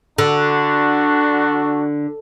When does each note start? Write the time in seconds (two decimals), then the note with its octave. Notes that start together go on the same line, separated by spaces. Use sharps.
0.18 D3 D4 F#4